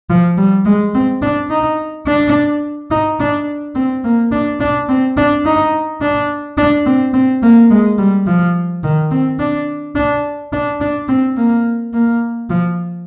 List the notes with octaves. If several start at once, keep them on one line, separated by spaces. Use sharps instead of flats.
F3
G3
G#3
C4
D4
D#4
D4
D#4
D4
C4
A#3
D4
D4
C4
D4
D#4
D4
D4
C4
C4
A#3
G#3
G3
F3
D#3
C4
D4
D4
D4
D4
C4
A#3
A#3
F3